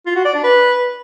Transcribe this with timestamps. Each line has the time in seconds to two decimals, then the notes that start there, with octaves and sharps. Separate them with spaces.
0.06 F4
0.16 F#4
0.25 D5
0.34 D4
0.44 B4